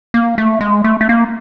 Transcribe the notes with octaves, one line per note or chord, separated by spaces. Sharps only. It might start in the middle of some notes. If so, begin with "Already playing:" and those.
A#3
A3
G#3
A3
A3
A#3